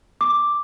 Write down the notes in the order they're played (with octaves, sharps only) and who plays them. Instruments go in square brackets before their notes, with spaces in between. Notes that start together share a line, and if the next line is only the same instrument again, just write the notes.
[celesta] D6